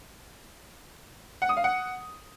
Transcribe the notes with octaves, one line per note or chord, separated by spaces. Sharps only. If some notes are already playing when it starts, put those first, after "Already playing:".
F#5
D#6
F5
F#5